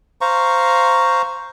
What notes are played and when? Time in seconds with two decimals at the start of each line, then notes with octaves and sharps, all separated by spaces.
0.21 C5 F5 A#5 C#6